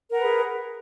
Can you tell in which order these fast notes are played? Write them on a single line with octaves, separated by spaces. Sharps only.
A#4 F#5 B4 G#4